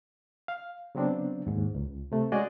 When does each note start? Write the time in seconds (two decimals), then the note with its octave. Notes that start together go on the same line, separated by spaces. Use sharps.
0.48 F5
0.95 C#3 F#3 B3 C4 D4
1.47 D#2 G#2
1.75 C#2
2.12 C3 A3
2.32 G#3 C#4 F#4 G#4 D5 D#5